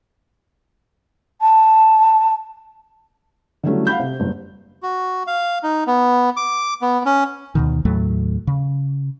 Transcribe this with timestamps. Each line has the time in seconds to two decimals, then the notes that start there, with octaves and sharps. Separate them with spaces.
1.41 A5
3.63 D3 E3 F#3 G3 A3 C#4
3.87 F5 F#5 B5 G6
4.00 C3
4.19 F#1 G2
4.83 F#4
5.27 F5
5.63 D#4
5.87 B3
6.37 D6
6.82 B3
7.05 C#4
7.55 D2 B2 D#3
7.85 D#2 A2 F#3 A3
8.47 C#3